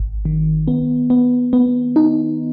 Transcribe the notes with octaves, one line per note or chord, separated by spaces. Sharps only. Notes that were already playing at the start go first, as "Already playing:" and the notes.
Already playing: G#1
D#3
B3
B3
B3
D#4